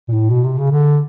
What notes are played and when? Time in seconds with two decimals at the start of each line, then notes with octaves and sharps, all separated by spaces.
0.09 A#2
0.13 A2
0.30 B2
0.44 C3
0.58 C#3
0.71 D3